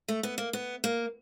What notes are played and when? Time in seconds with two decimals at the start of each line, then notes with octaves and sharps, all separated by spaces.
0.08 A3
0.23 B3
0.38 A#3
0.53 B3
0.84 A#3